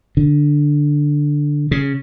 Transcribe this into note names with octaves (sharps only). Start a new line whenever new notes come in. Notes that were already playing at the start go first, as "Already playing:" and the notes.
D3
C#3